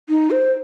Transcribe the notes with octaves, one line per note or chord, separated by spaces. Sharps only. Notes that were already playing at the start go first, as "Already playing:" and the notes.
D#4
C5